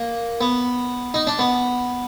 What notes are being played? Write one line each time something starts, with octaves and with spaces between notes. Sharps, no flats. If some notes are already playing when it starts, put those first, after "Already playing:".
Already playing: A#3
B3
D#4
D4
B3